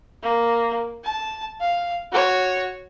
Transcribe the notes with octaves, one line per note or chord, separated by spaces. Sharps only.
A#3
A5
F5
F#4 C#5